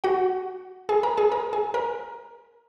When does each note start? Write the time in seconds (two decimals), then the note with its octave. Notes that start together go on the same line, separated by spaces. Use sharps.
0.04 F#4 F#5
0.89 G#4 G#5
1.03 A#4 A#5
1.17 G#4 G#5
1.32 A#4 A#5
1.53 G#4 G#5
1.74 A#4 A#5